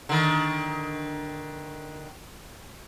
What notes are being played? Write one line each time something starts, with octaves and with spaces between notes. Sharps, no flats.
D3 D#3